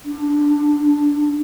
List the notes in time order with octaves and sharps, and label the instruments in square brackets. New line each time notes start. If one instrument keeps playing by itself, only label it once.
[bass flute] D4